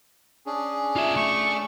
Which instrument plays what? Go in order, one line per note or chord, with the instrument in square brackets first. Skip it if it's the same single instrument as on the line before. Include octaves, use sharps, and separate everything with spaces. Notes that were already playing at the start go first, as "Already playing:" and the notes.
[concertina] C#4 D4 G#4
[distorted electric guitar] F4 E5
[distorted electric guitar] A3 [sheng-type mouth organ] C#6